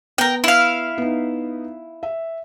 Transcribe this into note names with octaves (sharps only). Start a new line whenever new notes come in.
B3 A#4 G5
E4 F5
B3 D#4
E5